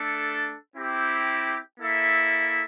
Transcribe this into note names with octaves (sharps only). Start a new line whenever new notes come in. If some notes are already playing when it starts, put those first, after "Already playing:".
Already playing: A3 D4 A4
C4 E4 G4
A#3 E4 A4 E5